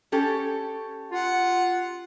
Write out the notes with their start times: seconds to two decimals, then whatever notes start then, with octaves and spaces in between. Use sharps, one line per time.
0.12 C#4 G4 A4
1.12 F4 F#5